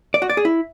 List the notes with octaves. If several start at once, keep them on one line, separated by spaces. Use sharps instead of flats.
D5
F#4
D5
G#4
E4